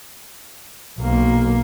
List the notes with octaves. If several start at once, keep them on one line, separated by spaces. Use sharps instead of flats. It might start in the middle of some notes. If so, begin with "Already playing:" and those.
B1 A#3